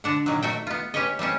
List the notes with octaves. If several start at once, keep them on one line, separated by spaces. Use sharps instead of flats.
D3 D4 F#5
A#2 D#3 F#3
A3 F#4 G5
B3 F4
C#4 G4 B4 C#5 D#5
G3 A3 C4 C#4